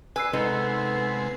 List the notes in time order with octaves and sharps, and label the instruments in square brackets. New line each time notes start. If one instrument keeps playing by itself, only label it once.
[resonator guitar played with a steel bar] B4 [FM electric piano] G#5 E6 C7
[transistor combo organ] C3 G#3 [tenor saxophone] B3 [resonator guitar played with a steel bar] D#4 A4 D#5